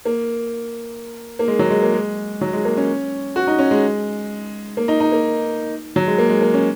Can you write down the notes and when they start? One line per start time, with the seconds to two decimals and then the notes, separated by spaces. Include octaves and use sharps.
0.05 A#3
1.39 A#3
1.48 G#3
1.59 F#3
1.70 G#3
1.82 A#3
1.94 G#3
2.41 F#3
2.53 G#3
2.65 A#3
2.77 C#4
3.36 F#4
3.47 D#4
3.59 C#4
3.71 G#3
4.77 A#3
4.88 D#4
5.00 D#4
5.12 A#3
5.96 F#3
6.07 G#3
6.18 A#3
6.29 G#3
6.42 A#3
6.54 C#4